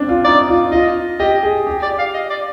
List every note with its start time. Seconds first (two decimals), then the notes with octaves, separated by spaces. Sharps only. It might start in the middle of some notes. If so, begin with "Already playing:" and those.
Already playing: C4 D4
0.09 F4
0.25 D#4 D5
0.48 F4
0.72 F4 D#5
1.20 G4 D#5
1.43 G#4
1.67 G4
1.83 D5
1.99 F5
2.14 D#5
2.30 D5